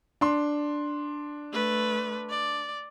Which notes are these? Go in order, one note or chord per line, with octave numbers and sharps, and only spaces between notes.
D4 C6
A3 B4
D5